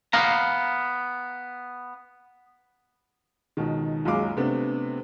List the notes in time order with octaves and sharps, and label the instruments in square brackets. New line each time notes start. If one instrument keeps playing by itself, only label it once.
[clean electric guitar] B3 F5 A#5
[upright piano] C#2 B2 D#3
F#1 C#2 F#3 G#3 F5 D6
C3 A3 B3 D4